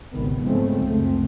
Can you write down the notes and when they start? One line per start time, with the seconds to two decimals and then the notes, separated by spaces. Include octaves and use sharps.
0.13 G#1 D2 C3 D#3 B3
0.43 G#2 C#3 F3 G#3 A3 C4
0.86 C#2 F#2 A3 C4